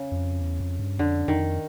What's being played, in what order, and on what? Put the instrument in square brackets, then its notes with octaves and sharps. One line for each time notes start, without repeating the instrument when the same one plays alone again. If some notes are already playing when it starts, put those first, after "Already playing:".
Already playing: [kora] C#3
[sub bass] F2
E2
F2
G2
[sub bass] F2 [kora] D3
[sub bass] F2 [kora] D#3